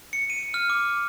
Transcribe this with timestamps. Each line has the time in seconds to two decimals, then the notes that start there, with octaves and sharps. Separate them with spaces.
0.13 C#7
0.30 D#7
0.54 F6
0.70 D6